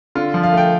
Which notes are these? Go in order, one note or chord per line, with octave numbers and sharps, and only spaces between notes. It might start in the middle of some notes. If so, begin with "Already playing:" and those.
D3 F4
F3
F5
A3 G5